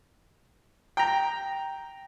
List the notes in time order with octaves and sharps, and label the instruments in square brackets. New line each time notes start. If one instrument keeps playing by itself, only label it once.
[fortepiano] G5 A#5